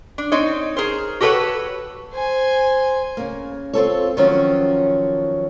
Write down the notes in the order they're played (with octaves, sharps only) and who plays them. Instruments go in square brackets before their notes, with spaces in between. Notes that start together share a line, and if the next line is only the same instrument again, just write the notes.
[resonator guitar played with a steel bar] D4
C4 D#4 C#5
G#4 A#4 C5
F#4 G4 A4 B4 C#5 F#5
[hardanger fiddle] C5 G#5
[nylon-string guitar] C#3 A#3
C4 F4 A4 C#5
D#3 F3 F#3 C#4